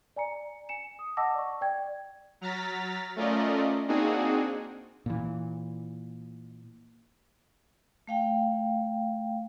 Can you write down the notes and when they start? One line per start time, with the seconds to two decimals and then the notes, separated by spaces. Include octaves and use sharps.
0.16 D5 G#5 A#5 C#7
0.69 G#5 C#7 E7
0.99 D#6
1.17 D#5 F#5 A5 D6 E6 A#6
1.35 D5 C#6
1.61 D5 G5 G#6
2.41 F#3 A#5 F6 A6 B6
3.16 A3 C#4 F4 A#4 D5 D#5
3.88 A#3 C4 D4 D#4 F#4 G#4
5.06 A#2 E3
8.07 A3 F5 G5